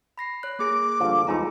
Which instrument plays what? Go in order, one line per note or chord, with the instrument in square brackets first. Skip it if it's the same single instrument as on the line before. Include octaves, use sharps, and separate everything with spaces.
[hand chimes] B5 A#6 C7
C#5 F#6
[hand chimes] A#3 G#4 D7 [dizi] D6
[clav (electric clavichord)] G2 D3 F3
[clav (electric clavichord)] E2 G#3 [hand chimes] D#4 F4 A#5